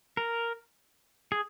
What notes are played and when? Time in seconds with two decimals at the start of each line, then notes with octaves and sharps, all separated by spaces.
0.17 A#4
1.32 G#4